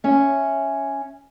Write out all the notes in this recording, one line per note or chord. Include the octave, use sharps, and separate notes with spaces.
C#4 E5